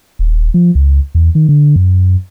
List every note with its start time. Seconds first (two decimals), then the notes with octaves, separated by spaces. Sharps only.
0.19 D#1
0.54 F3
0.75 C#2
1.15 E2
1.35 D#3
1.49 D3
1.76 F#2